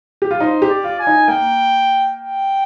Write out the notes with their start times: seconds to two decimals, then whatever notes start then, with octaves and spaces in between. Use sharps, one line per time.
0.22 G4
0.31 F4
0.40 D#4 C5
0.62 G4
0.69 D5
0.84 F4
0.99 G#5
1.07 D#4
1.28 A#3 G5
2.17 G5